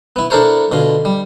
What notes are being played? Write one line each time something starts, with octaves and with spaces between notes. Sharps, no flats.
B3 E4
D4 E4 A4 A#4 C5 C#5
B2 D3 F4
G3